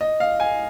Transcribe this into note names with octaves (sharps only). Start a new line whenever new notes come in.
D#5
F5
G#5